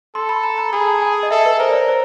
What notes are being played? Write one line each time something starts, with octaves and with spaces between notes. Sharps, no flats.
A4 C6
B5
A#5
A#5
G#4 B5
A5
G#5
D#5
A4 E5
B4
A#4 C5
D5
C#5
C5